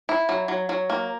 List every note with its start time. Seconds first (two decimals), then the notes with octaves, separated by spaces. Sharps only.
0.09 E4
0.29 F#3
0.48 F#3
0.69 F#3
0.90 A#3